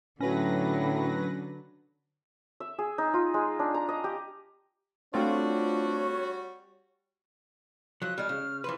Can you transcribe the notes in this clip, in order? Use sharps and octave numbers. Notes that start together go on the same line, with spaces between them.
A2 D3 F#3 C#4 B4 A#6
E5
G#4
D#4
F4
G#3
D4
A#5
D#5
G4
G3 A3 C4 D4 F4 F#4 C#5
F3 F#3 F#6
G3 G#3 F6
C#3
E3 F3 B4 C6